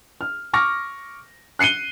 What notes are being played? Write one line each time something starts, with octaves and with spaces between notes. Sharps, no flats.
F6
C#6 D6 F6 A#6
F#6 C7 C#7 D#7 G7